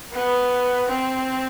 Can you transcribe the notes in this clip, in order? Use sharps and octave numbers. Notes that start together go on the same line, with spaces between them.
B3
C4